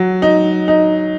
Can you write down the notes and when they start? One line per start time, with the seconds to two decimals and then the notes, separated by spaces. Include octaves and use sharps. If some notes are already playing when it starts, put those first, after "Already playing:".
Already playing: F#3
0.22 D#4
0.68 D#4